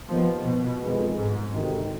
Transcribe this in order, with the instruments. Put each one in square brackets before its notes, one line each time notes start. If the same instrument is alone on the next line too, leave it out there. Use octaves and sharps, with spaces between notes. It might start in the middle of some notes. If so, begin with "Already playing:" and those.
[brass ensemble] D#2 D#3 B3 [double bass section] F3
[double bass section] B2
[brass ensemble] F2 D#3 G#3 B3
[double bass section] G#2
[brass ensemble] D2 C3 D#3